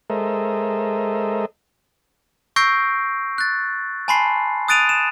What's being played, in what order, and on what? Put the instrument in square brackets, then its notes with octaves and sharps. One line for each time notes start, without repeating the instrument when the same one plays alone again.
[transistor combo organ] G#3 A4 A#4 C5 D#5 E5
[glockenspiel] C#6 E6 G6 A#6 C7 D7
F#6 A6
G#5 A5 B5 C6 C7
D#6 F#6 A6 D7 D#7 F7
E7